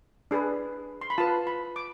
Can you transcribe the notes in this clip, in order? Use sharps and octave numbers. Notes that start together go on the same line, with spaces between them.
D4 G#4 B4
C6
B5
F4 B4 A5
B5
D6